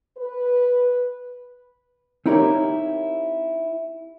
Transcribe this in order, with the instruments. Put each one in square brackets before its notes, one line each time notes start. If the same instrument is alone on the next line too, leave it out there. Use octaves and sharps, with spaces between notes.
[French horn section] B4
[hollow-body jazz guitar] C4 D#4 E4 G4 A#4 C#5